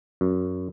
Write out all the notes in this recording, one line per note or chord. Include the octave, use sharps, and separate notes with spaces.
F#2